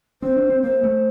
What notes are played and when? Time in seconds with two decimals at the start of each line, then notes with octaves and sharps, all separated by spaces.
0.22 C4 C5
0.37 D4
0.49 C4
0.62 A#3 C5
0.84 A3